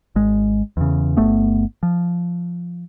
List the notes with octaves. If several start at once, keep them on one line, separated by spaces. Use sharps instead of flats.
G#1 G#3
E2 C#3
G1 A3 B3
F3